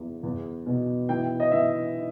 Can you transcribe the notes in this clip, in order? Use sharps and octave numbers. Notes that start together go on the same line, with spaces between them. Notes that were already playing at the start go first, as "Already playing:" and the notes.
Already playing: E2
E2
B2
E3 G5
D#5
E3 E5